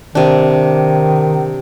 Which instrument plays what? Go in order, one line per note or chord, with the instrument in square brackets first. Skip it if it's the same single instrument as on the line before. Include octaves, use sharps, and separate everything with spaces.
[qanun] C3 D4 [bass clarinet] D#3